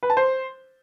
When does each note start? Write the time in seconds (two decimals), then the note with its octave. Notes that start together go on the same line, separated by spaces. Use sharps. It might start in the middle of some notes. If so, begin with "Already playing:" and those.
0.03 B4
0.10 A5
0.17 C5